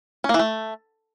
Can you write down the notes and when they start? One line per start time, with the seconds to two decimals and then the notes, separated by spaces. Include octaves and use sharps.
0.24 C#4
0.29 A#3
0.34 E3
0.39 A3